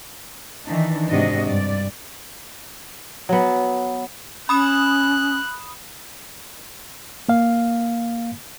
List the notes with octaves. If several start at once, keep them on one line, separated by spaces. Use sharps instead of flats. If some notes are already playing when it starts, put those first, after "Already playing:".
D#3 E3 D4 D#4
G#2 C3 D4 F#4 D#5
G2 D5
F#3 B3
C#4 B5 D#6 F#6 E7
A#3 F5